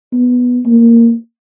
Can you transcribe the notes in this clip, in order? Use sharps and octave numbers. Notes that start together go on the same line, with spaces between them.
B3
A#3